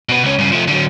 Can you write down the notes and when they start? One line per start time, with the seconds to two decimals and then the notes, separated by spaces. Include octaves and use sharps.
0.09 B2 B3
0.24 C#2 C#4
0.39 G2 C#3
0.52 F3 A3
0.68 D3 F#3